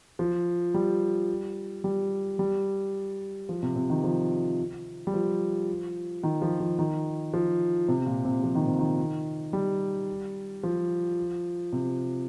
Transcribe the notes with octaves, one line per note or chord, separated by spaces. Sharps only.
F3
G3
G3
G3
F3
C3
C3
D#3
F3
G3
F3
D#3
F3
F3
D#3
F3
C3
A#2
C3
F3
D#3
C3
D#3
G3
F3
C3